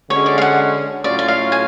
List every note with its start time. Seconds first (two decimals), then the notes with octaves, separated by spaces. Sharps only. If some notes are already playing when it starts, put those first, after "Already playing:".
0.10 D3 G#3 C#4 F#4 C#5
0.26 D5
0.38 F5
0.42 F#5
1.04 A2 F#3 C#4 F4 D5
1.19 D5
1.28 F5
1.52 G#5